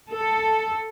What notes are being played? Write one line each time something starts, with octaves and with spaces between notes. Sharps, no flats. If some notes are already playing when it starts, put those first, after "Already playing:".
A4